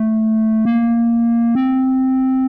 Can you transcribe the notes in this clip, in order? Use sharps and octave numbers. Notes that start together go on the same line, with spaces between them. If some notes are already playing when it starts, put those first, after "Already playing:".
Already playing: A3
A#3
C4